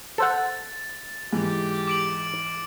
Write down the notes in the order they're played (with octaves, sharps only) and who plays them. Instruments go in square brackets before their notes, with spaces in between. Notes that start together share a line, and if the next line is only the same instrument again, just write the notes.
[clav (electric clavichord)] A4 C5 F#5 [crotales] A6
[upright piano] G#2 E3 [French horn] G4
[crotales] D6 D7 F#7